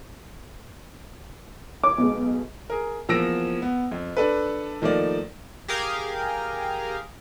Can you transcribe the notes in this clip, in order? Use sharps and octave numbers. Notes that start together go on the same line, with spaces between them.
C#5 D6
B1 B2 G#3
G#4 A#4
E2 F3 A#3 E6 A#6 D7
B3
F2
D4 A4 B4
D#3 F3 A3 A#3 D5
G4 G#4 A#4 F5